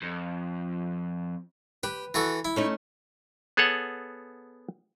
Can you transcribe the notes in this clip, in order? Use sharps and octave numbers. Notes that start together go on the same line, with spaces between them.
F2
G4 B4
E3 F#4 A4
E4
A3 C#4 D#4
B3 G#4 A4 C#5 F#5